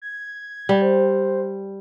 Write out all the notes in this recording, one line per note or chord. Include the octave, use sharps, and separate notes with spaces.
G#6
G3
C5